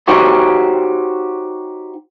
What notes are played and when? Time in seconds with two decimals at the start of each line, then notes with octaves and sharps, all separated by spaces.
0.08 D#4 F#4 G4 C5 C#5